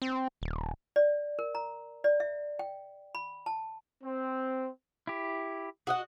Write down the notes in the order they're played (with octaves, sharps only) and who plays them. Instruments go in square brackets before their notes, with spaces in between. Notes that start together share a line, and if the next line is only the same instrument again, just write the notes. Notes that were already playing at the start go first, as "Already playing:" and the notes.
[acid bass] C4
D#1
[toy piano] D5
A#4
A#5
D5
E5
G5
B5
A5
[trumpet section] C4
[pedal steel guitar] E4 G4
[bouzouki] F#4 D#5 F#5